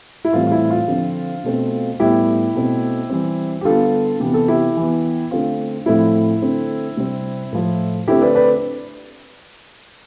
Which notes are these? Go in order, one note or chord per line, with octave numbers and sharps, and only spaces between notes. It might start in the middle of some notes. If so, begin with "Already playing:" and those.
E4
A2 E3 G3 C4 F4
F4
E4
F4
D3 F3 C4
B2 A3 C4
A2 G3 B3 E4 G4
B2 A3 C4
E3 G3 C4
G4
D3 G3 B3 F4 A4
C3 E3 B3 G4
A4
E4 G4
E3 B3
D3 A3 C4 F4
A2 F3 A3 C4 E4
D3 A3 C4
C3 G3 C4
A2 F3 A3
D3 A3 C4 E4 G4
B4 D5
B4 D5